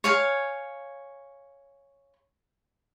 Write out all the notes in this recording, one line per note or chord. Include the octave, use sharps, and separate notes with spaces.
C#5 F5 G#5